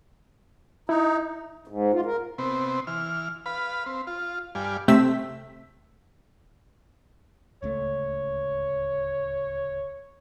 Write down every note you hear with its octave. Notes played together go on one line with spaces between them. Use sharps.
D#4 E4
G#2
F4
A#4
C3 B3 C4
E3 F6
B4 F5 B5
C4
F4
G2 G3 D5 F5 G#5
C3 A3 C4 E6 B6
D1 C#2 A3 C#5